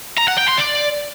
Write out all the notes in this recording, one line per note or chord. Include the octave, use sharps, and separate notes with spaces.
A#5
F#5
G5
C6
D5